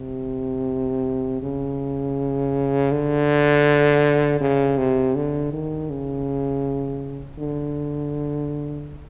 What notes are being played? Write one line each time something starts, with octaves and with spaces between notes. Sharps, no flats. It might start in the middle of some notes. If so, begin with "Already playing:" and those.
Already playing: C3
C#3
D3
C#3
C3
D3
D#3
C#3
D3